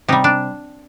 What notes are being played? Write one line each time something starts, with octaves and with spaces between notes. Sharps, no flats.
C3 G3 D#4
D4